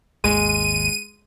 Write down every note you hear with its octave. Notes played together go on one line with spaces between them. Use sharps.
G#1 D#2 G#2 G#3 D#7